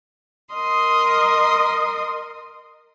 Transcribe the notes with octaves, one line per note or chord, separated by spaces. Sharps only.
A#4 D#5 C6 D#6